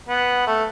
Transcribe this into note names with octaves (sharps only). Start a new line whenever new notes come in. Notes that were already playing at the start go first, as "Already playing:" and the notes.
B3
A3